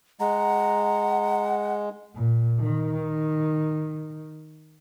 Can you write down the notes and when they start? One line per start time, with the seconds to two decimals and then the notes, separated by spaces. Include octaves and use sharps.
0.20 G#3 F#5 A#5
2.15 A#2
2.59 D#3